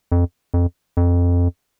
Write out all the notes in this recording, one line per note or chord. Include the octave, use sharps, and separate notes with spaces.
F2
F2
F2